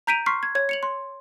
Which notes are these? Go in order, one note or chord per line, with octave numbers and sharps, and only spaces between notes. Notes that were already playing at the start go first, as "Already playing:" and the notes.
A#5 G6 B6 D7 D#7 F7
C6 C#6 F6 B6 C7
G#6
C#5 G#6
C#7 F7 F#7
C6